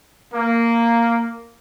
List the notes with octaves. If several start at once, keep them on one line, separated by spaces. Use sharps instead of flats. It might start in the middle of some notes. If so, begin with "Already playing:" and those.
A#3